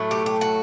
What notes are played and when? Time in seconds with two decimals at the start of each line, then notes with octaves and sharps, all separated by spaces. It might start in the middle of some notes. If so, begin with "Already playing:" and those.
Already playing: A2 F#3 A3
0.11 G4
0.26 G4
0.41 F#4